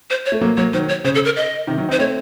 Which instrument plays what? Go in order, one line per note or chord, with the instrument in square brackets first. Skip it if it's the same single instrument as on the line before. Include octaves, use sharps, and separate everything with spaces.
[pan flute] C5
C#5
[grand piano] A3
F#3 A#3
[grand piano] F#3 A#3 [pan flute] C#5
[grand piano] D#3 F#3 [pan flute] C5
[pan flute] C#5
[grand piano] C#3 [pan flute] C5
[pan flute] A4
A#4
D#5
[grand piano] C3 D#3
D#3 F#3
C4 D#4
[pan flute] C5
[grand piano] A3 C4 [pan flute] C#5